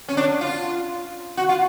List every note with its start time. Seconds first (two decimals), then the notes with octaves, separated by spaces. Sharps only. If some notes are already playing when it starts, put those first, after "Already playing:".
0.09 C#4
0.17 D4
0.41 F4
1.37 F#4
1.49 F4